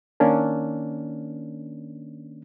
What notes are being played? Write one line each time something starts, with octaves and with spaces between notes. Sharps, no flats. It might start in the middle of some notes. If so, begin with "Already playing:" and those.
D#3 A#3 C#4 D4